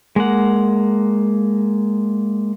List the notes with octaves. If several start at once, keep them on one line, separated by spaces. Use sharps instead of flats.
G#3 A#3 F#5